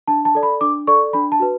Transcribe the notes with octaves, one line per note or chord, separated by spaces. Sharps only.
D4 A5
A5
A4 D5
B5
D4 D6
A4 D5 C#6
D4 B5
A5
F#4 B4